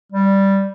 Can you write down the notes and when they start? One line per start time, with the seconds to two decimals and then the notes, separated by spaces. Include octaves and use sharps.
0.12 G3